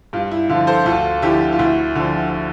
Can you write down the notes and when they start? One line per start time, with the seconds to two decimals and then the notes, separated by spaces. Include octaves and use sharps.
0.13 G2 F4
0.31 E4
0.49 D3 F4
0.54 F3
0.67 A4 C5
0.86 D2 F4 A4
1.22 D3 F3 E4 G4
1.53 F4
1.59 D2 E4
1.95 D3 F3